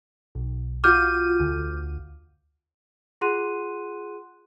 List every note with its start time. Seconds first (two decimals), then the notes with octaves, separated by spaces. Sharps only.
0.35 B1
0.84 F4 F#4 D6 F6 G6 D#7
1.40 D2
3.21 F4 G#4 F#5 C6 F#6 D#7